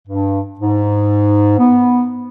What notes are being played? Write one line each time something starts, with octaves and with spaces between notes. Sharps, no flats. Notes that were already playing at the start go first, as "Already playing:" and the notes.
G2
G#2
B3